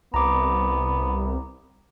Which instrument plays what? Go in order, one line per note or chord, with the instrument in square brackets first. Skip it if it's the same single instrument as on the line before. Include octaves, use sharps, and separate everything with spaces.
[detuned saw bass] C2 [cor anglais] B3 [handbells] A#5 D6